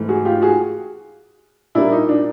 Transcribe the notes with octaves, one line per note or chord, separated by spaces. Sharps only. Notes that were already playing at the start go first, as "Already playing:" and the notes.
Already playing: G#2 E3 A3
F#4 G#4
F4 G4
F#4 G#4
A#2 G3 A#3 D4 E4
D#4
D4